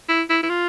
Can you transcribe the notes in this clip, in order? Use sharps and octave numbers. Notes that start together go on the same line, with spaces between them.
E4
E4
E4
F4